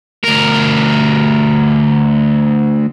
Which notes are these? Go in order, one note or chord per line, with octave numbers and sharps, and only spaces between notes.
D2 A#4